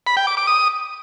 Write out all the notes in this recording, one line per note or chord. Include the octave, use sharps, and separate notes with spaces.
B5
G5
D6
D6
D#6